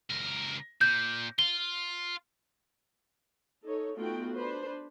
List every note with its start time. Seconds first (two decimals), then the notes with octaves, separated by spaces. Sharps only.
0.10 C#2 A#4
0.81 A#2 G6
1.39 F4 G7
3.65 D#4 A4 C#5
3.97 A3 B3 D#4 F4 F#4 G5
4.35 D4 B4 C5